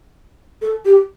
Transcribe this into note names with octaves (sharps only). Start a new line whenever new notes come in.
A4
G4